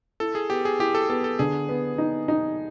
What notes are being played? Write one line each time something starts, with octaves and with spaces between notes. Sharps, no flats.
E4 A4
G#4
B3 G4
G#4
E4 G4
A4
B3 A4
A4
D3 G#4
B3
D#4
D#4